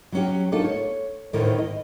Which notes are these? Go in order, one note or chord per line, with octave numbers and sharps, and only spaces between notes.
F#3 C#4 G4
A3 A#3 D4 D#4 F4 A4
C#5
D2 A2 D3 D#3 E4 A#4
D#5